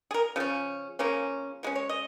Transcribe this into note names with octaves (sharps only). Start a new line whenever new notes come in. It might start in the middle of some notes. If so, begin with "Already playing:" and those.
G#4
A#4
C#3 F3 C#4
C#3 F3 A#3 C#4
F3 G#3 C#4
C#5
D#5